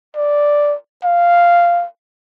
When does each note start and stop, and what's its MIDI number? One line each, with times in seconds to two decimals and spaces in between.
0.16 0.75 74
1.04 1.86 77